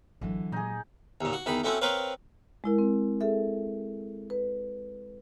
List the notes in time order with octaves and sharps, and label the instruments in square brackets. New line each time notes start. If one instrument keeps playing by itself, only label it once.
[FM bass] G#1 [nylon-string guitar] D3 E3 [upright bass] F#3 G#3
[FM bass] A#2 [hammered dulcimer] D#4 G#4
[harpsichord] D#2 A#2
F#4
E2 D#3 B5
A3 C4 C#4 E4 F#4
C4 A#4 B4 C#5 F5
[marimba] G#3 E4 A#4
C4
G#4 A4 E5
B4